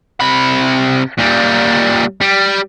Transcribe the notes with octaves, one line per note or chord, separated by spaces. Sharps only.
C3 B5
A#2 G3
G3